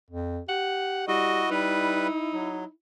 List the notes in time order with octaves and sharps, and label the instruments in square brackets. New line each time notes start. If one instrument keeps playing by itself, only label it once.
[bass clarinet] F2
[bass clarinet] G4 [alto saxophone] F#5
[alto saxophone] G3 [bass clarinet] E4 [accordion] F#4 D#5
[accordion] G3 B4 [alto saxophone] D#4
[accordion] F#3